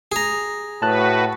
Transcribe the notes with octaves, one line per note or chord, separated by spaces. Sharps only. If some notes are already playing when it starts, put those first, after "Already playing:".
G#4 A#5
A2 F#4 B4 A5 F#6